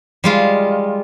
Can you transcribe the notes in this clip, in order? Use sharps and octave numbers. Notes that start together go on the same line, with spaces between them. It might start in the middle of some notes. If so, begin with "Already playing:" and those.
G3 G#3 F4